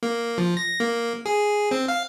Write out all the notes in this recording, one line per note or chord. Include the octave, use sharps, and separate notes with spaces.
A#3
F3
A#6
A#3
G#4
C4
F5